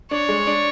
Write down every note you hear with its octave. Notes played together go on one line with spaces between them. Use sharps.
D4 C#5
G#3
D4